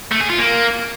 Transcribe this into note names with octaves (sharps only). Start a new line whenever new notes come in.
A3
G#4
F4
A#3